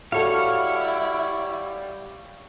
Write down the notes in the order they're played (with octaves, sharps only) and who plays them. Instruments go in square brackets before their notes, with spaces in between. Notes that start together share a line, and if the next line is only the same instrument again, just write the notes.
[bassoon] G3 [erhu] E4 [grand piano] F#4 A4 [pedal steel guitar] C#5 F5